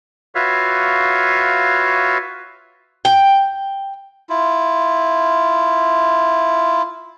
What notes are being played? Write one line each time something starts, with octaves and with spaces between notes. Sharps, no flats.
F4 F#4 B4 C#5 E5 F5
G5
E4 F4